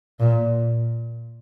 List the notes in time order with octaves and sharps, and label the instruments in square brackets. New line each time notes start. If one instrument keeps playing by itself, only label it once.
[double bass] A#2